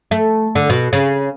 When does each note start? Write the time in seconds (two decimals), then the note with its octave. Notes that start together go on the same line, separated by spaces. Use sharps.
0.11 A3
0.55 D3
0.69 B2
0.93 C#3